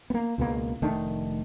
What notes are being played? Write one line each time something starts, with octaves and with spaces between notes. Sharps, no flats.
A#3 B3
C#2 B2 A#3
F1 D#3 A3 D4